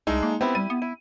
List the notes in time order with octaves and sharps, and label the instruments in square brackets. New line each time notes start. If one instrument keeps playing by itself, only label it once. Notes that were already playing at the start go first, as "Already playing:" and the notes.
[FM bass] C2 [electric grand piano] G#3 D#4 [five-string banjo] A3 D4
[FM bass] A#3
[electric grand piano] B3 C4 [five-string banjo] E4 G4
[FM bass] G3 [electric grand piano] D#7
[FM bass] B3
[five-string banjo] E4